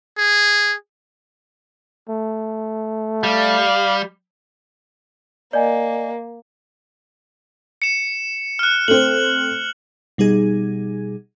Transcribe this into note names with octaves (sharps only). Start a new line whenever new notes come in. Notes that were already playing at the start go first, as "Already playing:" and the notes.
G#4
A3
G3 F5
A#3 D5 D#5 G#5
C#7 E7
F6 F#6
A3 C4 F#7
B2 G3 D#4 G#4 G#6